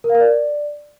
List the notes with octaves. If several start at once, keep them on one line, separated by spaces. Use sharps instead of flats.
A#4
F5
A#4
D5